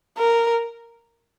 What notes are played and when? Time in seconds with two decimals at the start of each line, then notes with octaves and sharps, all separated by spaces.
0.18 A#4